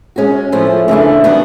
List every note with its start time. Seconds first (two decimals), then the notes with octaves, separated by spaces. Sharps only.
0.16 G#3 C#4 F#4
0.52 A2 F3 A3 C#4
0.88 C#3 E3 A3 D4
1.24 D#3 G3 B3 D4 F#4